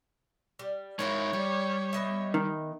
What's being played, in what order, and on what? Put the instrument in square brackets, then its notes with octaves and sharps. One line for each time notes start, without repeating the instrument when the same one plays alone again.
[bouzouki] G3
[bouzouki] F3 E4 F#4 [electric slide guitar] G#3 D#4 A#4 [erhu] C#5
[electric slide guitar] G3 [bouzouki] D5
[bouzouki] B3 D#5 E5
[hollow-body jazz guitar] D#3